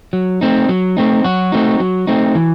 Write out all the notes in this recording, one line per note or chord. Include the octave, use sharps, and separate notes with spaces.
F#3
A3 C4 D#4
F#3
A3 C4 D#4
F#3 F#4
A3 C4 D#4
F#3
A3 C4 D#4
E3